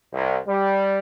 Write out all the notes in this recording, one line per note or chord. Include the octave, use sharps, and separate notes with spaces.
C2
G3